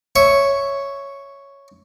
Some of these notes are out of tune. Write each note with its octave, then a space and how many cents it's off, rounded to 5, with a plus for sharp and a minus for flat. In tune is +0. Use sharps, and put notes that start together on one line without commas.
C#5 +0 E5 +0